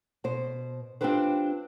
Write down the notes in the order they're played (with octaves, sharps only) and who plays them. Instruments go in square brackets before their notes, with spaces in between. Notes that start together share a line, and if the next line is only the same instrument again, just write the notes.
[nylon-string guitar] B2 C5
C4 D4 F4 G4 B4 C5